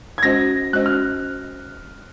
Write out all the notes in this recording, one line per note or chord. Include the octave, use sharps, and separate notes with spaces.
G#6
G#3 C#4 F#4 C5 D#5 A#6
G#3 C#4 F#4 C5 D#5 F#6
F6